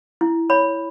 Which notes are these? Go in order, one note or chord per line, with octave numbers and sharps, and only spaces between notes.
E4
C#5 B5